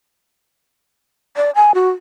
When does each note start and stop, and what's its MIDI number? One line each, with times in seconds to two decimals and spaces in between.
1.37 1.50 74
1.56 1.72 80
1.74 1.90 66